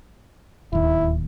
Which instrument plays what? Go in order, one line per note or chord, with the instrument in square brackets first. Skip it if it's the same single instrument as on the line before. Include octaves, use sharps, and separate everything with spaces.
[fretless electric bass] D1 D#2 [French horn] E4